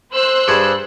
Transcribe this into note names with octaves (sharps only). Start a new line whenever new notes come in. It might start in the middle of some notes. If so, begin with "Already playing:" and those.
C5 E6 F#6
G2 G#4